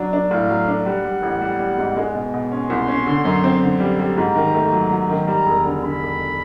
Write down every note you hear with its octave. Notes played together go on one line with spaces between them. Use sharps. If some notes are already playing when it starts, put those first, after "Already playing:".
Already playing: F#3 D4
D4
A2 F5
F#3
D4
G3 F#5
G3
A1
G3
G3
G#2
G#3
B2
B2
C#4 C6
C2
C#4
D3
F#2
C4
D3
G3
G3
G#2 A#5
D#3
A3
F#3
F#3
D#3
G3 A#5
E1
D3
D3 B5
E1